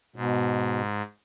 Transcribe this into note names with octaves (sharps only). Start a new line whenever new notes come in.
G#2 B2